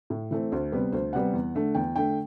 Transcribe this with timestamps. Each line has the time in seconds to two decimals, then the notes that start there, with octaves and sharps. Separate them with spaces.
0.10 A2
0.31 E3 A3 C4
0.52 D2 C5
0.72 C3 G3 B3
0.92 D2 C5
1.13 C3 G3 B3 F#5
1.33 E2
1.55 D3 A3
1.75 E2 G5
1.96 D3 A3 G5